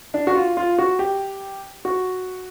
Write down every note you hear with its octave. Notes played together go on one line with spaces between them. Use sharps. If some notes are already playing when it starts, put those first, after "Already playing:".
D4
F#4
F4
F4
F#4
G4
F#4